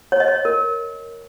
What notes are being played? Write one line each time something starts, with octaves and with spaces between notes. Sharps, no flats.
C#5
D#5
C#5
A#4